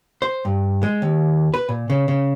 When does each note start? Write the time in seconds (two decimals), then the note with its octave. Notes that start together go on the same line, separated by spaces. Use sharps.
0.22 C5
0.45 G2
0.83 G#3
1.02 D#2
1.54 B4
1.69 A#2
1.90 C#3
2.08 C#3